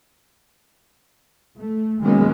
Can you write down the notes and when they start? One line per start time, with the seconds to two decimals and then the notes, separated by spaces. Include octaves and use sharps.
1.60 A3
2.02 D#3 F#3 G#3 A#3 B3 C#4